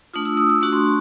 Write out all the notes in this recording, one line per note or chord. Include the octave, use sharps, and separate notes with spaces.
A3 D4 F4 D#6
E6
D#6
D#6
A3 D4 F#4 C#6
C6